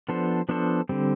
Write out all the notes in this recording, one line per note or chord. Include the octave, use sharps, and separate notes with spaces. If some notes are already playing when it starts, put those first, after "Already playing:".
F3 B3 D4 A4 C5
F3 B3 D4 A4 C5
D3 G3 C4